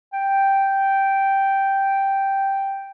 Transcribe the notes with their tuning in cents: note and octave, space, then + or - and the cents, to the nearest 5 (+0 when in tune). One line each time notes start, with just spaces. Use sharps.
G5 -5